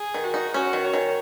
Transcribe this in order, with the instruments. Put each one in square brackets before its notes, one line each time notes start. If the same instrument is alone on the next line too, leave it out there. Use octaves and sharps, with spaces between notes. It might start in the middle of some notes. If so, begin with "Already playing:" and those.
Already playing: [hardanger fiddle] G#4
[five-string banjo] D#3
[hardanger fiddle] F#4
[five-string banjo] D#4
[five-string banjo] C#4 [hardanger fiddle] F#4
[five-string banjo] D#3
[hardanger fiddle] C#5
[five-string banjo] D#3